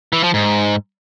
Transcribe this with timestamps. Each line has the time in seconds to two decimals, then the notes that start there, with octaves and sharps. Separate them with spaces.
0.13 E3
0.23 F3
0.34 G#2